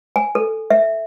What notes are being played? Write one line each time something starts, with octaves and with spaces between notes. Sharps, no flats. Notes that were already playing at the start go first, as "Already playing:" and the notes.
G#5
A4
E5